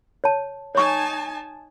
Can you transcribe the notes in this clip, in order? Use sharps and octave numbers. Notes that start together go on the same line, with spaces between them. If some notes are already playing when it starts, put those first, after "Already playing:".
C#5 A5
D#4 C#5 G#5 A5 C#6